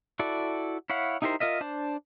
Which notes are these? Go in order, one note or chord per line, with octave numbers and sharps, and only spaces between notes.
E4 F#4 A4 D5
E4 C#5 F5 F#5
D#4 E4 G4 A#4 C5
F4 A#4 D#5 E5
D4 C5 A5